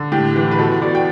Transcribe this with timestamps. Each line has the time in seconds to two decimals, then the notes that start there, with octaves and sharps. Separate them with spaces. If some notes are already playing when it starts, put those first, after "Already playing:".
Already playing: D3
0.12 A2 G4
0.36 E3
0.51 B4
0.59 B2 A4
0.82 B2 D5
0.95 G5